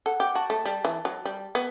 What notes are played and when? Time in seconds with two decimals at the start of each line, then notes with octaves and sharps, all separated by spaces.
0.06 A4 F#5
0.20 G4 G5
0.35 F#4 A5
0.50 A3 A5
0.65 G3 A5
0.85 E3
1.05 F#3
1.25 G3
1.55 B3